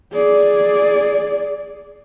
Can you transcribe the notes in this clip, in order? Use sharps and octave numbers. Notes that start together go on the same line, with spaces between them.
G#4 D5